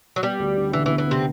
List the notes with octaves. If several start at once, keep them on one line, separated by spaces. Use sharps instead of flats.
F#3
G3 B3
D2
D3
D3 E3
E3
B3
E3
C3 B3 C4